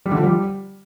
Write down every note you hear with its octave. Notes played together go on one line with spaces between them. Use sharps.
G3
D3
F3
G3